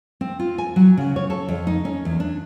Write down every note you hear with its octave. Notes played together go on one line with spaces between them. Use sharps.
C4
F4
G#5
F#3
C#3
C#5
A4
F2
D#4
C#4
E2
D4